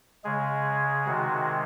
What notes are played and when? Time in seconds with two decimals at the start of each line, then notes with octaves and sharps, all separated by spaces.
0.24 C#3 G#3 G#4
1.06 C3 D#3 G#3 F#4